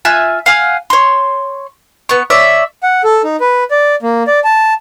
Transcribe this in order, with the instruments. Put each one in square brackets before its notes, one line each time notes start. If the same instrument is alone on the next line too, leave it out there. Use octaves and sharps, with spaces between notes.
[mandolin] F4 E5 G#5 F#6
F5 F#5 G#5 F6
C#5 C6
B3 C#6
C#5 D5 E5
[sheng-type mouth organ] F#5
A4
D#4
B4
D5
A#3
D5
A5